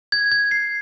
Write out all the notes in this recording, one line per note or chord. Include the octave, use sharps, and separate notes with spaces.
G#6
G#6
C7